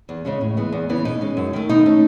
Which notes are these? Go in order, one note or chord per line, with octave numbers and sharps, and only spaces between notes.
E2
C#3 G#3 C#4
A2
E3 G#3 B3
E2
C#3 E3 B3
B2 D#4
G#3 C#4
F#2
D#3 A3
B2 D#4
A3 C#4